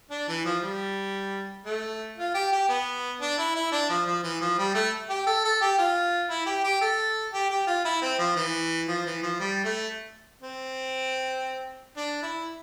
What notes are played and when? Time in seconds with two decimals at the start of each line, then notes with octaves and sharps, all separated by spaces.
0.11 D4
0.29 E3
0.45 F3
0.62 G3
1.66 A3
2.17 F4
2.34 G4
2.52 G4
2.69 B3
3.20 D4
3.38 E4
3.55 E4
3.72 D4
3.89 F3
4.06 F3
4.23 E3
4.41 F3
4.59 G3
4.75 A3
5.10 G4
5.27 A4
5.45 A4
5.61 G4
5.78 F4
6.30 E4
6.47 G4
6.64 G4
6.81 A4
7.33 G4
7.50 G4
7.67 F4
7.85 E4
8.02 C4
8.19 F3
8.36 E3
8.87 F3
9.06 E3
9.23 F3
9.40 G3
9.65 A3
10.42 C4
11.97 D4
12.22 E4